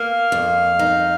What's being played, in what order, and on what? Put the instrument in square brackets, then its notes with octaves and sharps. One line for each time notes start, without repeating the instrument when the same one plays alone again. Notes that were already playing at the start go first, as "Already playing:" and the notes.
Already playing: [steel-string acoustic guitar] A#3 [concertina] F5
[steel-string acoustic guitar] F2
D#4